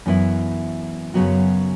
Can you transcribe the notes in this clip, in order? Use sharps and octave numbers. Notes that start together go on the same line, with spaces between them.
F#2 E3 B3 E4
F#2 C#3 F#3 B3 F#4